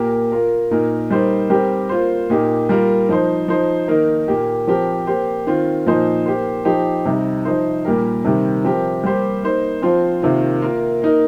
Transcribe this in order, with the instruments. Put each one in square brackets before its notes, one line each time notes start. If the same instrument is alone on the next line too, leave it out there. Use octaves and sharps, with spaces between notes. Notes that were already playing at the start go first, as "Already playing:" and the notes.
Already playing: [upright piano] A#2 A#3 G4 A#4
A#3 F4 A#4
A#2 A#3 D#4 A#4
G3 A#3 D#4 C5
G3 C4 G4 A#4
A#3 F4 C5
A#2 A#3 D#4 G4
G3 A#3 F4 A#4
F3 D#4 C5
F3 D#4 C5
D#3 A#3 D#4 A#4
A#2 A#3 G4
F3 C4 G4 A#4
A#3 G4 C5
D#3 C4 F4
A#2 F3 D#4 C5
A#3 G4 C5
F3 D#4 G4 C5
C3 G3 D#4
F3 D#4 C5
A#2 G3 A#3 G4 A#4
C3 D#3 G3
F3 C4 G4 A#4
G3 A#3 G4 C5
A#3 D#4 C5
F3 C4 F4 C5
C3 D#3 A#3 F4
A#3 F4 A#4
A#3 D#4 A#4